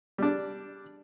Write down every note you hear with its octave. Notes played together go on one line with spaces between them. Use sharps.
G3 D4